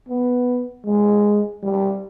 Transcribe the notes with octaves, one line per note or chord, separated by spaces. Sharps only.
B3
G#3
G3